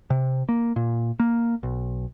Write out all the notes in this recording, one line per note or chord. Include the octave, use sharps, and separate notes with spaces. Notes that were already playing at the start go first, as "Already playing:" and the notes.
C3
A#3
A#2
A#3
B1